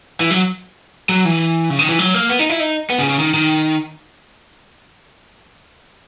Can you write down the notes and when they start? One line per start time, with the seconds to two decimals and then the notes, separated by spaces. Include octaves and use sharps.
0.20 E3
0.30 F#3
1.09 F#3
1.25 E3
1.70 C#3
1.79 D#3
1.89 E3
1.99 F#3
2.14 A#3
2.29 B3
2.39 D#4
2.49 E4
2.60 D#4
2.90 B3
2.99 C#3
3.09 C#3
3.19 D#3
3.34 D#3